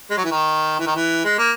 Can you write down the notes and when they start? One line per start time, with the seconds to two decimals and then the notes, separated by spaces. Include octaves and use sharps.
0.10 G#3
0.17 F#3
0.24 E3
0.31 D#3
0.79 E3
0.87 D#3
0.95 E3
1.25 G#3
1.38 A#3